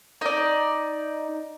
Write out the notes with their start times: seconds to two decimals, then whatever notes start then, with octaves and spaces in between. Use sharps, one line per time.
0.21 D#4 D5